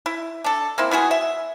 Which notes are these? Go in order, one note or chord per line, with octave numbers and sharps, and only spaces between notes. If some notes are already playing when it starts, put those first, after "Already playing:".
E4
D4 A4
A#3 C4 E4
B3 E4 F#4 G#4
E5